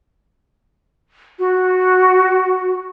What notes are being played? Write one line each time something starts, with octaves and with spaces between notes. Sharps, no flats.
F#4